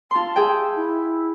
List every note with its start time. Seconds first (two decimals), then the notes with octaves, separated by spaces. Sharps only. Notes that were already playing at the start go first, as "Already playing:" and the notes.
0.11 F4 A5 C6
0.36 G#4 E5 G5
0.76 E4